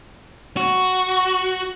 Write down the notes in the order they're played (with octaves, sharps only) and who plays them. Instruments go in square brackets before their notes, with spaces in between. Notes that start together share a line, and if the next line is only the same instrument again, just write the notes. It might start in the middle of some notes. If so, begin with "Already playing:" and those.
[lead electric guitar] F#4